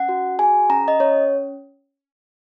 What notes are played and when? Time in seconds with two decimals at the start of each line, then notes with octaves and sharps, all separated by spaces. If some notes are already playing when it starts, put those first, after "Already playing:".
Already playing: C#4 F#5
0.09 F#4
0.39 G#4 G#5
0.69 C#4 A#5
0.88 D#5
1.00 C#4 C#5